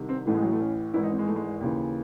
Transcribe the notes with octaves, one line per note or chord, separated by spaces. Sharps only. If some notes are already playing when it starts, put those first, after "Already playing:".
Already playing: C2 C3 D#3
C4
A1 A2 E3 A3
G#3
F#3
A3
C#4
G#1 G#2 E3 E4
D#4
C4
G#3
A3
G#3
D#2 C#3 E3